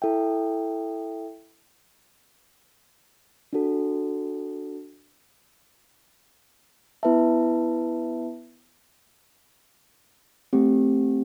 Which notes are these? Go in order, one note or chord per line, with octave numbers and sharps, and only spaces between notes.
E4 A4 E5 G5
D4 F#4 A4
B3 E4 B4 E5 A5
A3 C4 G4